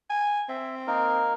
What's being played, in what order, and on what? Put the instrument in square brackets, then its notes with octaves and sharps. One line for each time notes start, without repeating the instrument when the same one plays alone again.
[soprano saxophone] G#5
[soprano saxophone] C4 [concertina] E5
[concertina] A#3 D#4 A#4